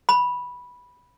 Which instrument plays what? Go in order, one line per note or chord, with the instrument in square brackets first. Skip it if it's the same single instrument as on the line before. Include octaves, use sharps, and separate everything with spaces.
[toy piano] B5